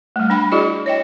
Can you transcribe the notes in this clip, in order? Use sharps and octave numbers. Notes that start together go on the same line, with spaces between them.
G3 A3
D4 G5 B5
E4 F#4 G#4 D5 D#5
C#5 D#5 G5